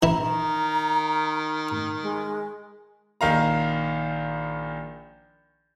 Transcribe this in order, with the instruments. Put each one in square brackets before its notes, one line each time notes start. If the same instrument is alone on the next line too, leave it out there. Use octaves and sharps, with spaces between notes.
[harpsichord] E3 E4 [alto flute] A#5
[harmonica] D#3
[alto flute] G#3
[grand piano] A#1 D#3 F5 A#5